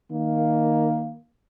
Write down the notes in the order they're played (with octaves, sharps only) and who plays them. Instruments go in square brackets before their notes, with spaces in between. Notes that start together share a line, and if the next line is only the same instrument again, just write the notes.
[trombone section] D#3 A#3